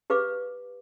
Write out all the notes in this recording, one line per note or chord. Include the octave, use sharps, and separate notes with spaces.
G4 B4 F5 D6